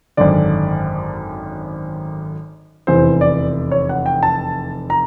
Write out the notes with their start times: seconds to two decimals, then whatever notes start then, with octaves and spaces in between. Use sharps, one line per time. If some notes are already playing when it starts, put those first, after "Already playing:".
0.17 G#1 F#2 D3 D5
2.87 F1 E2 C3 E3 C5
3.21 D5
3.71 C#5
3.89 F#5
4.06 G5
4.23 A5
4.90 A#5